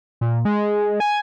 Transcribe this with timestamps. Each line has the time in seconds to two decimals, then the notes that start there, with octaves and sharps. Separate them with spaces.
0.21 A#2
0.45 G#3
1.00 G#5